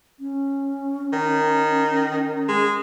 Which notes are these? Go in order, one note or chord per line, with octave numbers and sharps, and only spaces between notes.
C#4
D#3
G#3